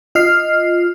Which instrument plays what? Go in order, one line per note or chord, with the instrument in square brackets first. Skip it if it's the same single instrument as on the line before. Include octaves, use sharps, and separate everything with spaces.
[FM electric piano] F4 D#5 F6 C7